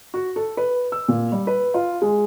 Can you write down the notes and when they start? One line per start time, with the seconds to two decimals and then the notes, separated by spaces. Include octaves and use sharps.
0.14 F#4
0.36 A4
0.57 B4
0.92 E6
1.08 A#2
1.32 G3
1.47 B4
1.74 F4
2.02 G#3